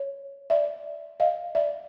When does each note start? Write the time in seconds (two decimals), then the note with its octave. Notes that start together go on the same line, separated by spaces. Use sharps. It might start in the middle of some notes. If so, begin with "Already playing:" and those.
Already playing: C#5
0.50 D5 E5
1.20 D#5 F5
1.55 D5 E5